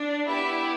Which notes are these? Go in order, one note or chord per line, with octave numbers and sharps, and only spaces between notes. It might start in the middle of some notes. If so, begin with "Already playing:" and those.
Already playing: D4
B3 E4 G4 E5